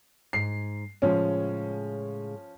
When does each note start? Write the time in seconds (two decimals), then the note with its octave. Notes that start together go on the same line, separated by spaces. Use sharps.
0.33 G#2 C7
1.02 A2 C#3 F3 G#3 C#4